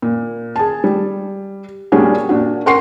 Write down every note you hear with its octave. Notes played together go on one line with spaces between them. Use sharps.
A#2
G#4 A5
G3
A#2 G3 C#4 D4 F#4 G#4
A#2 D4 F#4
A#4 F#5 C6 C#6 C7